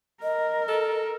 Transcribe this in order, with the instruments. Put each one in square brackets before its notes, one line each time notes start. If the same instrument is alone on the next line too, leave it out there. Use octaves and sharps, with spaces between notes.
[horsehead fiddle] A#4 [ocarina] D#5
[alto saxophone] A4